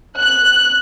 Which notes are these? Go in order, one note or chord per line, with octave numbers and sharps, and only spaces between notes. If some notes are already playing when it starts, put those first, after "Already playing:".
F#6